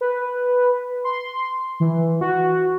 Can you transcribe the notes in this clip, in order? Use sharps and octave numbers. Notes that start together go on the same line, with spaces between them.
B4
C6
E3
F#4